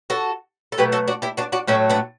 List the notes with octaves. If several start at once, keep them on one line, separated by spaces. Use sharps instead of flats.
F#4 A4
A4
B2 F#3 A3 G4 B4
F#4 A4
D4 F#4
E4 G4
D4 F#4
D4 F#4
A2 F#3 A3 C#4 E4
B3 D4